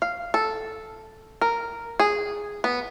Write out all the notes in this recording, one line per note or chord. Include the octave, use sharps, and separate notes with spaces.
F5
A4
A#4
G#4
B3